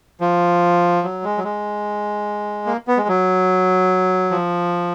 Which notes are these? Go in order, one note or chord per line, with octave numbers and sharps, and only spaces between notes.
F3
F#3
G#3
F#3
G#3
A#3
B3
G#3
F#3
F3